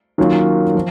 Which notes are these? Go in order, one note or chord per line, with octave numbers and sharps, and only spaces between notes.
D#3 F#3 A#3 C#4 F4
F3